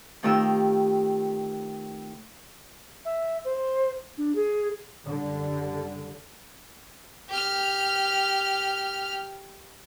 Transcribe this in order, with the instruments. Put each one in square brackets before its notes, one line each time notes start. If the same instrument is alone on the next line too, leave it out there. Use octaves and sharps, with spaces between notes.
[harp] C3 D#3 A3 F4 G4 E6
[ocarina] E5
C5
D4
G#4
[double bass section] F#1 D3 G3
[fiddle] G4 F6